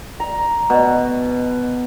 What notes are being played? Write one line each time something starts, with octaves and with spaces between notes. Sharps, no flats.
A#5
B2